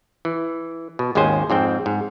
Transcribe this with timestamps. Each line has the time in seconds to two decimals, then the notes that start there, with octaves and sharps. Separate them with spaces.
0.25 E3
0.99 B2
1.15 G#1 D#2 G#3 C#4 C5 G#5
1.50 F2 G#2 C4 G5
1.86 G#2